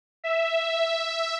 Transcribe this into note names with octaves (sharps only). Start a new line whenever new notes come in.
E5